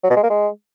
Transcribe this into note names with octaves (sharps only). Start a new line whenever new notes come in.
F#3
B2
G#3
A#3
G#3